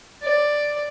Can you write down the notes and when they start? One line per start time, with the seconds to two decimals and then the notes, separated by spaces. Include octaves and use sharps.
0.23 D5